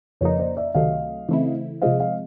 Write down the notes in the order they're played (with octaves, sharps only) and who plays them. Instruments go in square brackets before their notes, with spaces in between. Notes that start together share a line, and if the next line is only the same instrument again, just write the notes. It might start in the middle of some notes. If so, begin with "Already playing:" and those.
[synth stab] F2 C#3 F3 A#3 D#4 [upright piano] B4 C#5
[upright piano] C5 D5
D5 E5
[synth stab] C#2 C3 D#3 F#3 A3 [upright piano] D#5 F5
[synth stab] C#3 E3 A3 C4 E4
[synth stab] C3 F3 G#3 C4 [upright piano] D#5 F5
[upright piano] D#5 F5